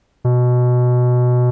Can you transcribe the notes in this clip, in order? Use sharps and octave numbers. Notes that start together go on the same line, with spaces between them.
B2